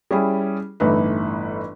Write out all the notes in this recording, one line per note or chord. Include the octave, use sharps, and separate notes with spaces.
G3 C#4 E4 G4 G#4
G1 A2 E3 A3 D#4 B4